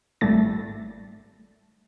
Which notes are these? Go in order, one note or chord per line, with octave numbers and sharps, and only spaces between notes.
G#1 G3 A3 A6